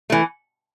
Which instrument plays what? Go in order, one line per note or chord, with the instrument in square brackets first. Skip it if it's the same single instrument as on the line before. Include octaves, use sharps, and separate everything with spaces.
[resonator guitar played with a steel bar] E3 A3